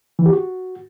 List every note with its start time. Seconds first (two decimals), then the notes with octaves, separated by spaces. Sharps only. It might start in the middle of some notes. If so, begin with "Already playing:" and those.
0.19 E3
0.26 G4
0.33 F#4